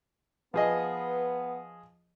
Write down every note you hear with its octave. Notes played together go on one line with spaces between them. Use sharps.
F3 B3 G#4 B4 D#5